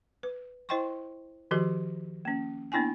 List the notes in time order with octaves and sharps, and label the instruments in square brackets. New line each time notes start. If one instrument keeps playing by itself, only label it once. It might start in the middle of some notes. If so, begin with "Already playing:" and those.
[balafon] B4
E4 C5 D#5 G5 C6 C#6
D#3 F3 F#4 G4 A4 D#5
A#3 C#4
A#3 B3 D4 E4 G5 G#5